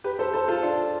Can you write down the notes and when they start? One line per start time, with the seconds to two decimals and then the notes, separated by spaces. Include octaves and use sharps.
0.04 G4 B4
0.19 A4 C5
0.33 A4 C5
0.48 F4 A4
0.63 D4 F4